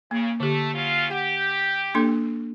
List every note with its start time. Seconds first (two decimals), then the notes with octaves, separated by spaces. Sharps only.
0.11 C#3 A#3
0.40 D3 A3 G4
0.74 F#3 C#4 F4
1.11 G4 F#5
1.94 A#3 D4 A4